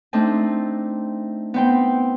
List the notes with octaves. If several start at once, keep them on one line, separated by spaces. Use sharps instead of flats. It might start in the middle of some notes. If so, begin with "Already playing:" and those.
A3 C4 D4 D#4
B3 C4 G5